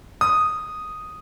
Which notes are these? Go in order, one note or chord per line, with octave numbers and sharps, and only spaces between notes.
D#6